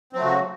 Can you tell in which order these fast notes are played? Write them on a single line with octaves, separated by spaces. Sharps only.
C4 F#3 A3 C#3 F#4